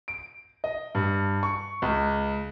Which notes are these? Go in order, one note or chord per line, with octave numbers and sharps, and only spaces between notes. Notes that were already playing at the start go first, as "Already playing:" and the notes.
D7
D#5
G2
C#6
C#2